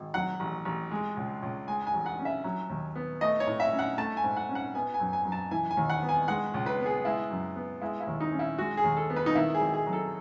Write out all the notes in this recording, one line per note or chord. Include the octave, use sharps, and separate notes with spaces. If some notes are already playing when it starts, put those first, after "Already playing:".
Already playing: G#1
F#3 F#5
A1
A1
G#3
C#2
C#2
G#3 G#5
G#5
A1
F#5
C#4
E5
F#3
D#2
B3
A3 D#5
C#5
A2
E5
C#4
F#5
A3 A5
G#5
G#2
F#5
C#4
F#5
B3 G#5
G#5
F#2
G#5
F#2
A5
E3 G#5
G#5
D#2
F#5
B3
G#5
G#3 F#5
C#2
B4
B3
G#4
G#3 E4
F#2
B3
G#3 E4
E4
D#2
D#4
C#4
E4
G#3 F#4
G#4
D#2
A4
B3
B4
D#4
D#3 E4
G#4
G#1
G#4
F#3
A4